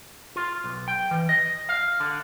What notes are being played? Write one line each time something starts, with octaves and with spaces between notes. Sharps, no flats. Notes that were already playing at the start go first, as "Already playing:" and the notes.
F4
B1
G5
E3
D#5
F5
D3